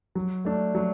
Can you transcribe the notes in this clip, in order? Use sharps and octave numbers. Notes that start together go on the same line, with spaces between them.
F#3
A3 D4
F#3